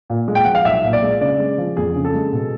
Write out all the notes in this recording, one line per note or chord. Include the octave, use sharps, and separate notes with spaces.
A#2
G#3
G5
F3 F#5
F5
B1 E5
A#2
D5
G#3
C#3 D5
G#3
F3
F2 G#4
C#3
A4
G#3
B2